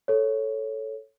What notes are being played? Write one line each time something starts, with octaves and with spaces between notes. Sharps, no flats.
A4 C#5